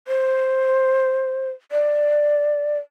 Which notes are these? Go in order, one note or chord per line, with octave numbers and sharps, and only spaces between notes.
C5
D5